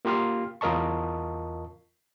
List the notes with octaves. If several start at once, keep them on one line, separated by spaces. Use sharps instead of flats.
A#3 F4 G4 C6 F6
E2 F4 A#4 D#5 A5 C#6